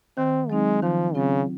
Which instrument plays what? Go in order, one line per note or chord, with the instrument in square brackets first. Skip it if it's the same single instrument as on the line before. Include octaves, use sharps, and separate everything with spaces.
[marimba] D#3 [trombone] C4
[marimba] F#3 C4 D#4 [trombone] G#3
[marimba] D#3 [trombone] F3
[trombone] C#3 [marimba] F#3 C4 F4